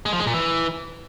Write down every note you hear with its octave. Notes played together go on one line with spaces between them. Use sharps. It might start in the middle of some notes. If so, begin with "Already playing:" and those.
G#3
F3
G#3
A#2
E3